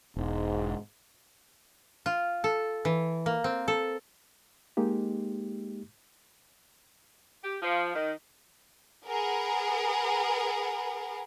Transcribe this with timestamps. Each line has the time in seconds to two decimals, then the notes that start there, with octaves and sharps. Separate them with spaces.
0.16 E1 G#2
2.06 F4
2.44 A4
2.85 E3
3.26 A#3
3.44 C4
3.68 A4
4.77 G#3 A#3 D#4 G4
7.43 G4
7.62 F3
7.95 D#3
9.06 G#4 A#4 B4 F#5